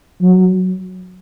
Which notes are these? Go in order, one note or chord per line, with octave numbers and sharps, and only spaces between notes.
F#3